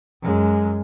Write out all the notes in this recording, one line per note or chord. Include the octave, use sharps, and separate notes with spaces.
F#2 G#3